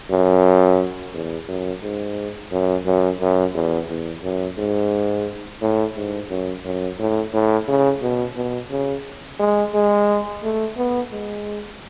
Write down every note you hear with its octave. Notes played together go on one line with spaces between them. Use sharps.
F#2
E2
F#2
G#2
F#2
F#2
F#2
E2
E2
F#2
G#2
A2
G#2
F#2
F#2
A2
A2
C#3
B2
B2
C#3
G#3
G#3
A3
B3
G#3